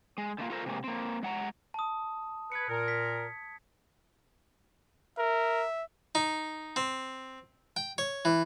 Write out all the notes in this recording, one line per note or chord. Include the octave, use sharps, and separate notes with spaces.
G#3
D3 A3 A#3 F4
F4 A4 A#4 C5
C3 G#3 A#3
A#3 C4
G#3 F#5 A#5
A5 D#6
B4 G#6 C#7
A#2 A#4
B6
A#4 E5
D#4
C4
G5
C#5
E3